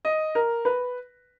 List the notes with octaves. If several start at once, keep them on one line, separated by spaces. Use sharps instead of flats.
D#5
A#4
B4